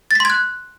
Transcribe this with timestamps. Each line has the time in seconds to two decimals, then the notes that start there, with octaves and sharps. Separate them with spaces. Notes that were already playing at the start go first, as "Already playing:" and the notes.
0.11 A6
0.15 B6
0.20 C6
0.25 G#6
0.30 F#6